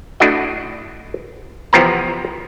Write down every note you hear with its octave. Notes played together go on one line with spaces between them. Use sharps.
A3 D4 E4 F#4 D#5
E2 C3 F3 B3 C4 A#5